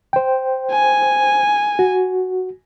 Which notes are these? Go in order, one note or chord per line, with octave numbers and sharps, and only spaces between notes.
C5 G5
G#5
F#4